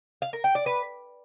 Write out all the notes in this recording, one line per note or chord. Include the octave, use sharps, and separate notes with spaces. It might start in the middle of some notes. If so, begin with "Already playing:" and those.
F5
A#4
G5
D5
B4